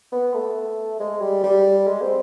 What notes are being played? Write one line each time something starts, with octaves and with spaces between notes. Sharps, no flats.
B3
A3
G#3
G3
G3
G#3
C4